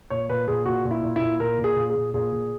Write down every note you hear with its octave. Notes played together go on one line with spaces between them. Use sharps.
A#2 C#5
A#2 B4
A#2 G#4
A#2 F#4
A#2
E4
A#2
E4
A#2
A#2 A#4
A#2
G#4
A#2
G#4
A#2
A#2 G#4
A#2